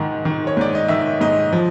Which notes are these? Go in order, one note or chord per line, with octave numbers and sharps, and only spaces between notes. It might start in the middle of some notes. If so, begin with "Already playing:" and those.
Already playing: G#2 D#3 F#5
D#3
C#5
G#2 D5
D#5
D#3 E5
G#2 D#5
F3